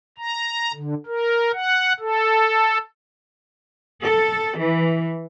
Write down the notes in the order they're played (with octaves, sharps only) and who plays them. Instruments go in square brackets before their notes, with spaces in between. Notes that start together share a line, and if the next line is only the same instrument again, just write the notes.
[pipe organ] A#5
D3
A#4
F#5
A4
[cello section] A4
E3